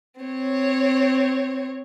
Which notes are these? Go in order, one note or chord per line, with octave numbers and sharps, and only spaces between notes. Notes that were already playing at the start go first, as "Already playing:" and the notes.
C4 C#5